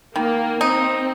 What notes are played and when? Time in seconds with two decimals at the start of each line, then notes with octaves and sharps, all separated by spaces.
0.15 D#3 A#3
0.60 C4 D#4